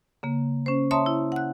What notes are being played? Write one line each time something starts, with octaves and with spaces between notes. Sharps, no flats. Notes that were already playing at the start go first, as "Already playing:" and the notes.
C#3 A#3
C#4 C5
C#5 E5 A5 A#5 C6 D#6
E4
F#5 F#6